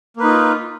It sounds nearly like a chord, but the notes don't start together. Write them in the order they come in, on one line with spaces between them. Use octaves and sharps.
A#3 B4 D#4 F4